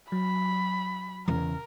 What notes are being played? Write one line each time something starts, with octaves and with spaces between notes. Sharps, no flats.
F#3 B5
E2 C#3 A#4